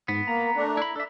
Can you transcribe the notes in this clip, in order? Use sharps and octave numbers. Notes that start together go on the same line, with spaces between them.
G#2 B3
A#3 A#5
A3 D4
E4 B5
D4 A4 E5